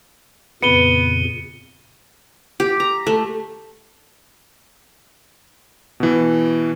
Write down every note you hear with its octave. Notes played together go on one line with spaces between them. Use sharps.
F2 A#2 C#3 B3 C#7 D#7 G7
G4
A#5
A3
B2 E3